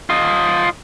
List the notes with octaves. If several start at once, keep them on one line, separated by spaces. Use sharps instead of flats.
F4 D#5